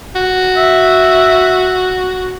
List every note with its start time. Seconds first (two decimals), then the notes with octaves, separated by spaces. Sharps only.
0.15 F#4
0.57 E5